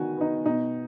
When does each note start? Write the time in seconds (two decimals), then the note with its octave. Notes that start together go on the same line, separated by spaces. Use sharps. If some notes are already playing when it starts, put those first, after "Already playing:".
Already playing: D#3 B3 F#4 G#5
0.17 B3 D#4
0.46 B2 D#4